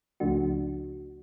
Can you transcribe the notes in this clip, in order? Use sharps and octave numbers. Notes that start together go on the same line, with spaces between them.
C#2 C#3 F3 A3 D4 F#4